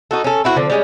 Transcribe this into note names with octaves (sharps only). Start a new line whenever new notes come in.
D#4 F#4 A4
C#4 A4
C4 E4 F#4
D3 F3 C4
G3 G#3 C#4